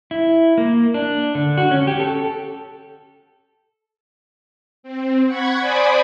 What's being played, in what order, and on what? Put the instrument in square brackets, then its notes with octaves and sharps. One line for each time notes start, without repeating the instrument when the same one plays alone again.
[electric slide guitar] E4
A#3
D4
D3
F#4
C#4
G4
A4
[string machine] C4
F#5 B5 C#6 G#6
C5 D5 G#5 B5 D6 D#6